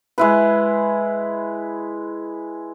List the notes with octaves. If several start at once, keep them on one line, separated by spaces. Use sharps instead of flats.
G#3 E4 B4